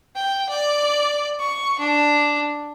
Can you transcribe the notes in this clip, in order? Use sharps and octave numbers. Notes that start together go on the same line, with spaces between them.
G5
D5
C#6
D4